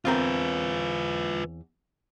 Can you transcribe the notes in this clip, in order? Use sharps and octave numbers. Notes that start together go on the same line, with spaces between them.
E2 C4 F4 A#4 B4